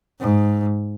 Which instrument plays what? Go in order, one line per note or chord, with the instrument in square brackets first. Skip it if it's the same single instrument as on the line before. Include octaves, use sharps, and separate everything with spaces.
[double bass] G#2